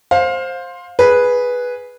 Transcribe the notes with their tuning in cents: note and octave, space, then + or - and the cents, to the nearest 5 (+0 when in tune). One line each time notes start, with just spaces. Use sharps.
C5 +10 F5 +20
G#4 +0 B4 -5